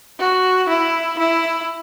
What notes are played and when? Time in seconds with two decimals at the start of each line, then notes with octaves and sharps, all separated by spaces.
0.19 F#4
0.69 E4
1.19 E4